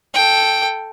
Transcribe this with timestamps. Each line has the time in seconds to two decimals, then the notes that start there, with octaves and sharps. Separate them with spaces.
0.14 A4 G5